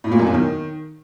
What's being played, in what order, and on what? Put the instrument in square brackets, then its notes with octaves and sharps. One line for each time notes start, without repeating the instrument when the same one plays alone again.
[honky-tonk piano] A2
A#2
F#2
E2
D#3